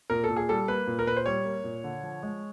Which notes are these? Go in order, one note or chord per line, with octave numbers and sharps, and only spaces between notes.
A#2 A#4
A4
A#2
G#4
G3 A4
A#3 B4
A#2
A#4
A#2 B4
C5
G3 C#5
A#3
A#2
D3
F3
G#3